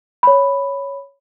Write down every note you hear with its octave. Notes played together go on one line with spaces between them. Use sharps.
C#5 B5